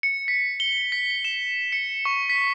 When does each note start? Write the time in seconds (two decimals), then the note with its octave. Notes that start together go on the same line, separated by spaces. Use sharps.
0.03 C#7
0.28 B6
0.60 G7
0.92 B6
1.25 E7
1.72 C#7
2.05 C#6
2.29 B6